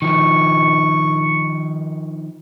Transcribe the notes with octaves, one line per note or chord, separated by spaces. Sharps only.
D#3 F3 C#6